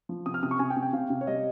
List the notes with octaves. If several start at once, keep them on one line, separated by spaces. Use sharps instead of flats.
F3
C3 D#6
F6
C3 D#6
C#6
C3 G#5
G5
C3
G5
C3 F5
C3
C#5
G3 D#5